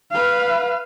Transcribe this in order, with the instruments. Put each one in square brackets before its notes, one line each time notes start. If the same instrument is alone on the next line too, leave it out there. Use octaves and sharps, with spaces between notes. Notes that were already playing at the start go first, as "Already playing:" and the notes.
[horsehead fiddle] B4 F5